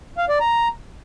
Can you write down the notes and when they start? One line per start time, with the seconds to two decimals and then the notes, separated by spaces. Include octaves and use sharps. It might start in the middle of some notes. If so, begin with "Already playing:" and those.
0.18 F5
0.29 D5
0.40 A#5